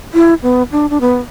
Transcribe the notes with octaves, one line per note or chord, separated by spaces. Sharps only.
E4
B3
D4
D4
B3